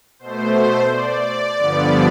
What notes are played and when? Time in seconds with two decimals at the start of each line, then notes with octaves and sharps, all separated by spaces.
0.19 B2 A3 C5
0.89 D5
1.58 G2 D3 F3 B3